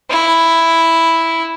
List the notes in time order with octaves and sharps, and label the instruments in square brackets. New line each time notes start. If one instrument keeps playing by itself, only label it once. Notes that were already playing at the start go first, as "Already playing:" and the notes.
[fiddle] E4